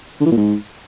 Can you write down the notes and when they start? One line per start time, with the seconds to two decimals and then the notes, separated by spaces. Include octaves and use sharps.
0.20 D3
0.26 E3
0.31 A#2
0.37 G#2